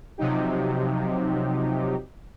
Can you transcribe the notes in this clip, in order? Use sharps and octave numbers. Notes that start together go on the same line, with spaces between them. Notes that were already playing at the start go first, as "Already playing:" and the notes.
C3 F3 F#3 D#4 G4